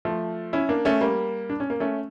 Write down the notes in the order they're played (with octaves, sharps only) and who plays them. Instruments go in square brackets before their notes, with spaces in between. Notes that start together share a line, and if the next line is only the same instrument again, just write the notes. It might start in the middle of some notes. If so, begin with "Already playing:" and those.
[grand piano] F3 A3
C#4 E4
A#3 D4
A3 C#4
G3 A#3
D4
C#4
A#3
A3 C#4